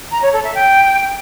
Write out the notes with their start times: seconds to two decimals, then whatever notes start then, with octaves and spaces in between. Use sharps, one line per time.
0.11 A#5
0.22 C#5
0.33 A4
0.43 E5
0.54 G5